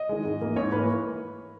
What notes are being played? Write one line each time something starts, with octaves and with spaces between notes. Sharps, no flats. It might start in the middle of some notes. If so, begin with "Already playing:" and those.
Already playing: D#5
D#3 G#3
G#2
E3 A#3
G#2 C#5
E3 A#3 B4